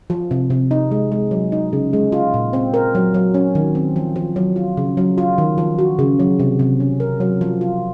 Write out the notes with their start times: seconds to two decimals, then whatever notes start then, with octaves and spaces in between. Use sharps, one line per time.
0.10 F3
0.31 C3
0.50 C3
0.71 D#4
0.91 G#3
1.12 G#3
1.31 F#3
1.52 D#4
1.73 C#3
1.93 G#3
2.12 F4
2.34 A#2
2.53 C4
2.74 A#4
2.95 F#3
3.14 F#3
3.34 C#4
3.55 D#3
3.75 C4
3.96 F3
4.16 F3
4.36 F#3
4.56 F4
4.77 C#3
4.97 F#3
5.18 F4
5.38 D#3
5.58 F3
5.79 F#4
5.99 C#3
6.20 F#3
6.40 C3
6.59 C3
6.80 C#4
7.00 A#4
7.20 F#3
7.41 F3
7.61 F4